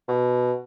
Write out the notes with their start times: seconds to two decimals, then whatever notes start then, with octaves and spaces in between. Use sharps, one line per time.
0.08 B2